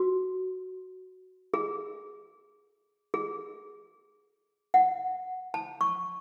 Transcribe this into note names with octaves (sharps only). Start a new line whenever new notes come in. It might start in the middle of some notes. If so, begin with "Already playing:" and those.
Already playing: F#4
G#4
G#4
F#5
A5
C#6